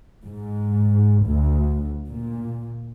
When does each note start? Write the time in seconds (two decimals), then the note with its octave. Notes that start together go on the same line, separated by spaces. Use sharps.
0.24 G#2
1.26 D2
2.09 A#2